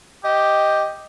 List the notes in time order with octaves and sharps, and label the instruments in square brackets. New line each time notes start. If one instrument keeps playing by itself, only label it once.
[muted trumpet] G4 [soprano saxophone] D#5